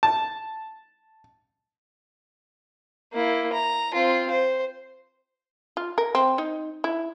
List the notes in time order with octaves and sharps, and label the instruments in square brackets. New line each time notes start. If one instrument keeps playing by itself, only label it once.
[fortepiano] A5
[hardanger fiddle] A#3 E4
A#5
C4 F4
C5
[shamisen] F4
A#4
C4
D#4
E4